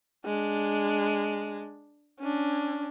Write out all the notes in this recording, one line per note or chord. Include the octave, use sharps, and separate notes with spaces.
G#3 D4
C#4 D4